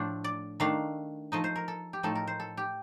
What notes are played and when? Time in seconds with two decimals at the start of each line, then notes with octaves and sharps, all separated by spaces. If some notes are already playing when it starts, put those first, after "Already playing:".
Already playing: A2 F3 A3 D4 C5 F5
0.24 D5
0.60 D#3 A3 D4 F5
1.32 F3 A3 D#4 D#5
1.44 C5
1.56 A#4
1.68 A4
1.93 G4
2.03 A2 F3 A3 D#4 A4
2.15 A#4
2.27 C5
2.40 A4
2.57 G4